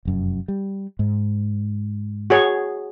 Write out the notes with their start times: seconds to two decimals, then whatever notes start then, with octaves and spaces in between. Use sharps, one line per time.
0.05 F1 F#2
0.48 G3
0.99 G#2
2.30 F#4 G#4 C#5